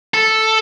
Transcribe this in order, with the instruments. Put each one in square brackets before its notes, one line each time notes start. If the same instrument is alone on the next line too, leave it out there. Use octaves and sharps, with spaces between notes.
[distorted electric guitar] A4